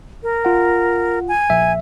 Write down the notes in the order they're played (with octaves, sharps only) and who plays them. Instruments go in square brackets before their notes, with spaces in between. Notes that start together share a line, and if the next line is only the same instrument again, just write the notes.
[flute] A#4
[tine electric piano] F4 F#5
[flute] G#5
[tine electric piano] A#1 E5